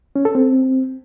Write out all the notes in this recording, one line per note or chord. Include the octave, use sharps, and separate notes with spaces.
C#4
A4
C4